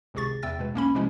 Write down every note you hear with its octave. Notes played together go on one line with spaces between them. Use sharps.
G#1 C#2 C3 G#4 C#6 A6
E2 E5 G5 E6 A6
B2 G#3 B4
B1 A#3 C#4 B5
C3 F3 G#3 C#4 E4